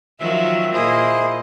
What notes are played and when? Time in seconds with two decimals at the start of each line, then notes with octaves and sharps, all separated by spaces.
0.20 D#3 F3 F#3 E5
0.74 A#2 A#3 E4 G#4 C5 D#5